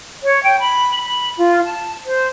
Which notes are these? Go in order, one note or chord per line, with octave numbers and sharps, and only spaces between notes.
C#5
G5
B5
B5
F4
A5
C5